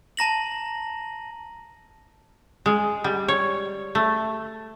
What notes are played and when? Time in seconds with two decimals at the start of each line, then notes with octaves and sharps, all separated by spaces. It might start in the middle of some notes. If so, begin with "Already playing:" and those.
0.17 A5 A#5 A#6 F#7
2.66 G#3
3.04 G3
3.28 C#5
3.95 A3